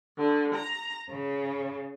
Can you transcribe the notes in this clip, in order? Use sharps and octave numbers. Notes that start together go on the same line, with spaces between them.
D3
A#5
C#3